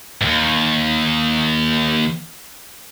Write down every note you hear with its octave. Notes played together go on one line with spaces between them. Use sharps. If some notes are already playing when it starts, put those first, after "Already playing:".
D#2 G#2